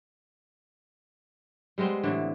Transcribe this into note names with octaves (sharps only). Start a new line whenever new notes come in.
G3 G#3 B3 C4
A2 D3 E3